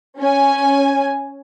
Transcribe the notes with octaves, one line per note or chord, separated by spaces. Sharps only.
C#4 G#5